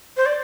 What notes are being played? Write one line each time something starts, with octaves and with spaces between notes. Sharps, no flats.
C5
D5